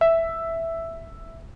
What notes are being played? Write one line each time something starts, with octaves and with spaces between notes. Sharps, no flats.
E5